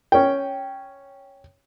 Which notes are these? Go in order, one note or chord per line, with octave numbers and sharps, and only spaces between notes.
C#4 G5